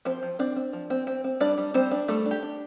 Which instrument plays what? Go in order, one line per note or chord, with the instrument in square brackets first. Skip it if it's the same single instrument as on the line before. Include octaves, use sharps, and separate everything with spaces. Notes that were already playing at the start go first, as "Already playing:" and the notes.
[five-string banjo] F3 C4 C5
F3
C4 D4 D5
C4
F3
C4
C4
C4
G3 D4 D5
G3
G3 C4 C5
D4
G3 A3 A4
D4
G4
D4